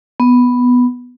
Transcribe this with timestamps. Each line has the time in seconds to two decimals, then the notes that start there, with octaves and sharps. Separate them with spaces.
0.20 B3